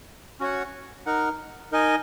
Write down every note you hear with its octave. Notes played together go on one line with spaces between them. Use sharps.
C#4 F#4 C#5 F#5
D#4 A#4 F#5
D#4 A#4 D#5 G#5